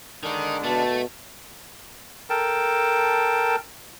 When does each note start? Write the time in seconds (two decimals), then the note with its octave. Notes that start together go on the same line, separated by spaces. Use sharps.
0.23 D3 D#3 G#3 D4 D#4
0.64 B2 A3 A5
2.30 A4 A#4 G5 A5